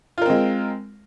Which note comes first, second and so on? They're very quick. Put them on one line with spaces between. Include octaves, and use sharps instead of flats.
F4 A#4 C4 G#3